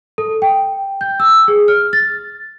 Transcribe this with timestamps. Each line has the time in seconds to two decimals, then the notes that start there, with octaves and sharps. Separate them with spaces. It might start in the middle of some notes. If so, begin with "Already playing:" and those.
0.18 A4
0.42 G5
1.01 G6
1.20 E6
1.48 G#4
1.68 F6
1.93 A6